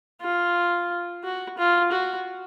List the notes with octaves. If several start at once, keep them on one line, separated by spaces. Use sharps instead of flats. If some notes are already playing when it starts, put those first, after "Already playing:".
F4
F#4
F4
F#4